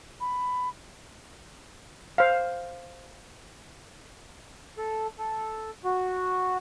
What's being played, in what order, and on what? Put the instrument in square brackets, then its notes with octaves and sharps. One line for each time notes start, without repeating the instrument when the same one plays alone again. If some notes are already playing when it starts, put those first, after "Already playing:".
[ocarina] B5
[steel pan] C5 F5
[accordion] A4
A4
F#4